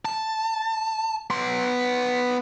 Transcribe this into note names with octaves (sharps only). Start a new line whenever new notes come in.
A5
B3 C6